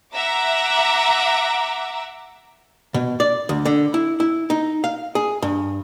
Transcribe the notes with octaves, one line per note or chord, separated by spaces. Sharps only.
E5 F#5 A#5 D6
B2
D5
D2
D3
E4
E4
D#4
F5
G#4
G2